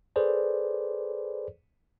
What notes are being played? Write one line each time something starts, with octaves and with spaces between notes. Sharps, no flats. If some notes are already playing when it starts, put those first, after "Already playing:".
G#4 A4 B4 C5 D5